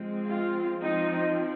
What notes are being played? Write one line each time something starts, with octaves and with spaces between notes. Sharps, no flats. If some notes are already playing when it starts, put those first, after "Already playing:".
Already playing: F3 G#3 C4
F4
F3 C4 D#4